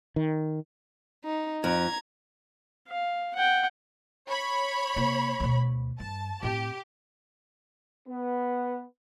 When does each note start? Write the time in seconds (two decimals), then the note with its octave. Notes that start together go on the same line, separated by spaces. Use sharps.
0.16 D#3
1.25 D#4
1.64 F2 A#5 G#6
2.88 F5
3.35 F#5 G5
4.27 C#5 B5
4.96 C3 A#3
5.40 D2 B2
6.00 G2 A5
6.43 A2 C4 G4
8.07 B3